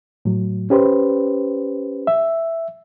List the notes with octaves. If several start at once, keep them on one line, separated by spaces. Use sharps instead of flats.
A2 F#3
C#4 G4 B4 C5
E5